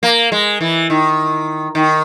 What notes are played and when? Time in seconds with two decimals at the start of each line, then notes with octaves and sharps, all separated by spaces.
0.03 A#3
0.32 G#3
0.61 E3
0.90 D#3
1.75 D#3